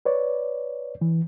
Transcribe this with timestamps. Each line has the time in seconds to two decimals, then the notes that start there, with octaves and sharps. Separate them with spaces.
0.05 B4 C#5 D5
1.01 E3